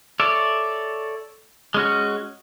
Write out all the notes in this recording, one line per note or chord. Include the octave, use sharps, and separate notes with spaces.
A4 C#5 D5 E5
G#3 C#4 F#4